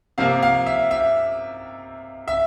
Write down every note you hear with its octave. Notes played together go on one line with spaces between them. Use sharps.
C3 F3 A#3 F5
F5
E5
E5
E5